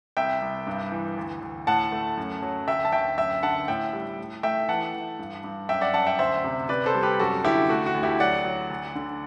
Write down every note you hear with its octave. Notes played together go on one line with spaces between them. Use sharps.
C2 E5 G5
C2
G2
E3
D2
D2
A2 F#5 A5
A3
F#2
F#3
D2 E5 G5
A5
D2 E5 G5
F#2 E5 G5
D3 F#5 A5
A2 E5 G5
G3
A2
A3 E5 G5
E3 F#5 A5
E3
G2
G2
F#2 E5 G5
D5 F#5
F#2 F#5 A5
E5 G5
D2 C5 E5
C3
C3 B4 D5
A4 C5
G3
G4 B4
F#2 F#4 A4
D3 E4 G4
A3 F#4
F#4
D2
E4 G4
F#3 D5 F#5
F#3
D2
D3